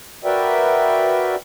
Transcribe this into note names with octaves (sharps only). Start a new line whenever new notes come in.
F#4 A#4 B4 D5 E5 G5